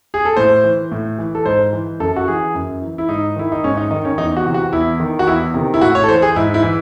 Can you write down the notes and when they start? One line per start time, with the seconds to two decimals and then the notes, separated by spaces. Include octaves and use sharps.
0.14 G#4
0.25 A4
0.37 A2 C5
0.64 E3
0.92 A2
1.19 E3
1.35 A4
1.46 G#2 C5
1.73 E3
2.00 F#2 A4
2.16 F#4
2.27 E3 G#4
2.55 F#2
2.82 E3
2.98 E4
3.09 G#2 D#4
3.36 D#3 E4
3.52 D#4
3.64 G#2 C#4
3.77 D#4
3.91 D#3 D#4
4.05 C#4
4.18 E2 D#4
4.37 F#4
4.46 C3 E3
4.54 F#4
4.72 E2 E4
5.00 D#3
5.19 F#4
5.27 E2 E4
5.54 C3 D#3
5.74 E4
5.81 A2 F#4
5.95 C#5
6.04 A4
6.08 E3 C5
6.22 G#4
6.36 G#2 E4
6.54 E4
6.63 E3